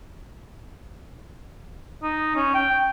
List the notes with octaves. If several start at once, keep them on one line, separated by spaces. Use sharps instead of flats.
D#4
C#4
G5